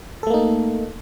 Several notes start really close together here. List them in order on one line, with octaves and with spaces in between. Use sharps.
A4 A3 A#3 D#4